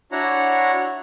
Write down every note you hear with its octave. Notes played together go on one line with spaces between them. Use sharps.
D4 E4 F#4 C#5 F#5 A#5